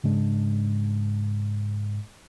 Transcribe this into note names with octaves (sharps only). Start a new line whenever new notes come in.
G#2 C#3 G#3 D4